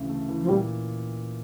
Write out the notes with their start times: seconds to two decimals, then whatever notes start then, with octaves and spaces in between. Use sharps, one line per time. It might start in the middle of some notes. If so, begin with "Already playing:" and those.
Already playing: D2 C#3 E3
0.09 A3
0.29 E3
0.43 F3
0.49 A#2 G3